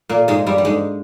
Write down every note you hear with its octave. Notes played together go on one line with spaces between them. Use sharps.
A#2 A#3
G#2 G#3
G2 G3
G3
G#2 G#3